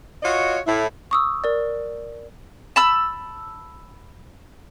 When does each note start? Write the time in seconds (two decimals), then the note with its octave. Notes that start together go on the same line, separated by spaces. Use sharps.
0.23 F4 F#4 C#5 D#5
0.66 A2 E4
1.11 C#6 D#6 E6
1.44 A#4 D5
2.76 A5 B5 E6